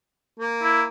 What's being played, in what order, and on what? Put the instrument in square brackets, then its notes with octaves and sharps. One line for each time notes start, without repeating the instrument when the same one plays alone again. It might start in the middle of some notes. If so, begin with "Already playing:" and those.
[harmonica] A#3
[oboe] E4